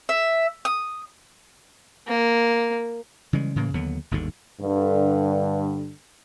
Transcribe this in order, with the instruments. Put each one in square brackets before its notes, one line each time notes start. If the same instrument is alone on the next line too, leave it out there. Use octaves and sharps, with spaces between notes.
[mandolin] E5
D#6
[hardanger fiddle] A#3
[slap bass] C#3 E3 G3 G#3
A2 C#3 E3 A#3
D#2 D3 F#3 B3
G1 D#2 G#2 D3
[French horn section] G2 D3